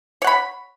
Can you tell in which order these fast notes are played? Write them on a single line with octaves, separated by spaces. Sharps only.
C#5 F#5 B5